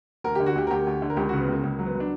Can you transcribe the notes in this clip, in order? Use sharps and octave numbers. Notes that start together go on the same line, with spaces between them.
D2 A#4
D3 G4
F#4
D2 G4
A#4
D2 G4
D2
D3
A#4
C#2 G4
F#4
C#3
B3
C#2 A#3
C#2 A#3
F#3
B3
F#3
D4